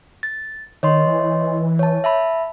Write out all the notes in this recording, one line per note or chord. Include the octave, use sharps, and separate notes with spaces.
A6
D#3 C#5 D#5 C6
E3
C#5 A5
E5 A5 B5